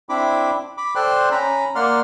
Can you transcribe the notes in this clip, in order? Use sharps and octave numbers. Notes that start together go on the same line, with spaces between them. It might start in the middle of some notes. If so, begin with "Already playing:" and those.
C4 D4 E4 B5 D6
B5 D6
A4 C5 D5 G5 C6 F#6
C#4 A#5 B5
A#3 D5 F#5 C6 F6